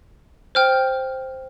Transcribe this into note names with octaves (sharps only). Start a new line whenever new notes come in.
C5 G5 F6